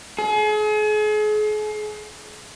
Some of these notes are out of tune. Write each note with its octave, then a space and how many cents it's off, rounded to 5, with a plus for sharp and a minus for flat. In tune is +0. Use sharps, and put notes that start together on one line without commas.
G#4 +40